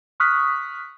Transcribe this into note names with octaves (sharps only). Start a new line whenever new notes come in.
C#6 D#6 F6 F#6 B6